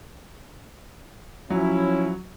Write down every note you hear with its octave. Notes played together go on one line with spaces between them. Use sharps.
F3 F#3 C#4 E4